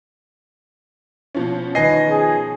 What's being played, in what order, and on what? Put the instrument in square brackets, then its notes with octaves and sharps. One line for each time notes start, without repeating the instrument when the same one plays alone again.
[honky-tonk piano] B2 F3 C#4
[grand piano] D#3 B4 C7 [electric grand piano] D#5 G#5 A#6
[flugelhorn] G#4